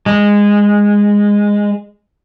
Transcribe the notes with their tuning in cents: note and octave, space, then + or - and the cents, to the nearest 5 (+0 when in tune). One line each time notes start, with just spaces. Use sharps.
G#3 -15